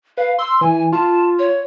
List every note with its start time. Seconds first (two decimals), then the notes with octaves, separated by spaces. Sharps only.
0.18 B4 F5
0.39 C6 E6
0.61 E3 G#5
0.92 F4 A5
1.39 C#5